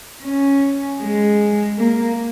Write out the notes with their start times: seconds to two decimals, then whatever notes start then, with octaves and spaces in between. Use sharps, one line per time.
0.23 C#4
1.00 G#3
1.78 A#3